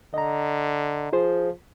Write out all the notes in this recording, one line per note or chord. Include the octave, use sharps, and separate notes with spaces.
D3 D#5 A#5
F3 F4 G#4 C5